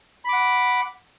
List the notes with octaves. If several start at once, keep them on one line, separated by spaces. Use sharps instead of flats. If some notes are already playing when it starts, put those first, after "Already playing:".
F#5 B5 D6